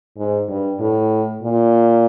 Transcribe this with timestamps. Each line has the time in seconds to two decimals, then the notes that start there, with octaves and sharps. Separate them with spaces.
0.18 G#2
0.49 G2
0.81 A2
1.43 A#2